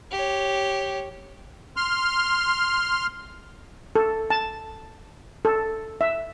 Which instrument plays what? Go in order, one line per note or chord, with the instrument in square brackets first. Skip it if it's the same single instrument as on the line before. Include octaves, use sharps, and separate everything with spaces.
[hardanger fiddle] G4 C#5
[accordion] C6 F6
[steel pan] A4
A5
A4
E5